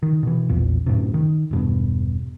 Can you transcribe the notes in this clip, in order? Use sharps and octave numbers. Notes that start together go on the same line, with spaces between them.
D#3
B2 E3
A#1 E2 A#2
D1 F#2 A2 C3
D#3
E1 G2 B2